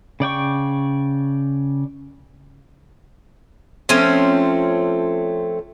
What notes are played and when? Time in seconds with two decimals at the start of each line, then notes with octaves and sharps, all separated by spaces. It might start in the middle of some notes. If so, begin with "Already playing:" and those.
0.20 C#3 D5 G5 C#6
3.89 F3 A3 C4 C#4